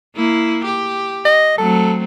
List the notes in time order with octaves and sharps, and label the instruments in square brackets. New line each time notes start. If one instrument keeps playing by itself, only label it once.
[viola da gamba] A#3 E4
G4
[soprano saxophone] D#5
[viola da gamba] F#3 A3 C4 [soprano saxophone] A4